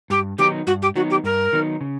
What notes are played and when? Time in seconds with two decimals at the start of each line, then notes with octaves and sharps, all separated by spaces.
0.10 G2 G4
0.38 D#3 F#3 B3 D#4 G4
0.66 G2 F#4
0.82 G4
0.95 D#3 F#3 B3 D#4 F#4
1.10 G4
1.24 G2 A#4
1.53 D#3 F#3 B3 D#4
1.81 C#3